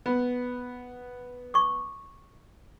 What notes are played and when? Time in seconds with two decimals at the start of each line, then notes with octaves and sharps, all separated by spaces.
0.06 B3
1.54 C#6 D6